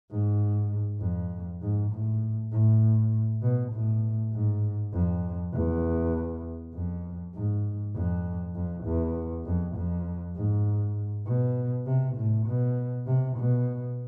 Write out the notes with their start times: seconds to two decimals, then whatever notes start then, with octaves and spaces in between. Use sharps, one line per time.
0.10 G#2
1.00 F2
1.61 G#2
1.92 A2
2.51 A2
3.42 B2
3.72 A2
4.33 G#2
4.93 F2
5.53 E2
6.74 F2
7.34 G#2
7.94 F2
8.55 F2
8.84 E2
9.45 F2
9.75 F2
10.36 G#2
11.26 B2
11.86 C3
12.16 A2
12.46 B2
13.06 C3
13.37 B2